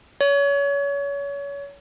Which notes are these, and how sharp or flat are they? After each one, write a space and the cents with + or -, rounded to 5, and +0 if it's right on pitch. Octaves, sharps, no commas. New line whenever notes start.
C#5 +30